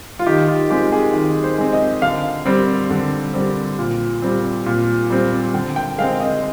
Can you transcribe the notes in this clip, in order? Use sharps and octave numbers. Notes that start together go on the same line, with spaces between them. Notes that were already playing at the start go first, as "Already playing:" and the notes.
F4
D#3 G4
F4
G#3 C4 G4
G#4
D#3
C5
G#3 C4
D#5
D3 F5
G3 C4
D3
G3 C4
A#2
G3 C4
A#2
G3 C4
D3 G5
G5
G#3 C4 F5
D#5